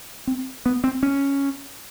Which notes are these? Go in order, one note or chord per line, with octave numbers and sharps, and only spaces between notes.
C4
B3
C4
C#4